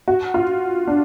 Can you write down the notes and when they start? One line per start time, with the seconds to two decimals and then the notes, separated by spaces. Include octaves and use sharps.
0.08 F#4
0.34 F4
0.87 D4